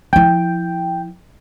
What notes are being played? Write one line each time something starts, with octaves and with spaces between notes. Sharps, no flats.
F3 E4 G5